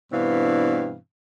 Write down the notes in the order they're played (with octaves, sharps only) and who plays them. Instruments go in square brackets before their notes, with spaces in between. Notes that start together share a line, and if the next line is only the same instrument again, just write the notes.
[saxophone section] G2 B2 E3 C4 D4 F5